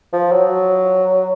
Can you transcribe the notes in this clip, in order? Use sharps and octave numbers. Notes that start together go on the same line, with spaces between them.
F3
F#3